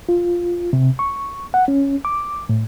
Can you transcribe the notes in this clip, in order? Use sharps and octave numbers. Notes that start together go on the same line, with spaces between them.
F4
C3
C#6
F#5
C#4
D6
A2